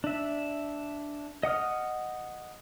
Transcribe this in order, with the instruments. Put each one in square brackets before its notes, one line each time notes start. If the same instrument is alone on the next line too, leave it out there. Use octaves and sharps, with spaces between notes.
[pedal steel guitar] D4 E5
D#5 F#5 D#6 F6